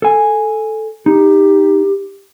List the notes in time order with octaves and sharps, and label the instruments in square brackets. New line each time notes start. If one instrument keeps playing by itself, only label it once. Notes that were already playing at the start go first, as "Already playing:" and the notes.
[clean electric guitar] A4 G#5
[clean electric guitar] D#4 [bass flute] G4